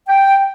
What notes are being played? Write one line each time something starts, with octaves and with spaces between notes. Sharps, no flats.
G5